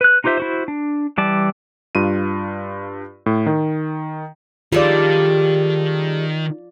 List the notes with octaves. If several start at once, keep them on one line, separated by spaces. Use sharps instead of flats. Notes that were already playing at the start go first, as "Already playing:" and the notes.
B4 F#6
D#4 F4 G4 C5 E5
E4 F#4 C5
D4
E3 G3 D5 A5
G2 F4 D#7
A2
D#3
D#3 G3 G#3 F4 A4 D5